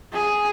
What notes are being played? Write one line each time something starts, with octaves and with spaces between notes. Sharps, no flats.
G#4